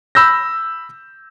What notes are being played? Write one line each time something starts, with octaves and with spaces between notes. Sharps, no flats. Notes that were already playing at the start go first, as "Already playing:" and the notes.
B5 E6 G6 A#6